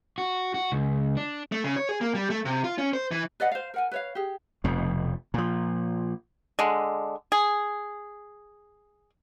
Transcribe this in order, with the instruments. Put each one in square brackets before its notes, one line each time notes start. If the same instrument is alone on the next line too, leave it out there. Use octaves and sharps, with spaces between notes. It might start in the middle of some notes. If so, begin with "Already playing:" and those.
[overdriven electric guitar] F#4
F#4
C#2
D4
[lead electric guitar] A3
C#3
C#5
G#4
A#3
G3
A3
C3
F4
C#4
C5
E3
[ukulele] B4 D5 D#5 F#5
C5 F5
A#4 F#5 G#5
B4 C#5 F5
G4 G#4
[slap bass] F1 F2 B2
A#2 F3
[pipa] D3 G#3
G#4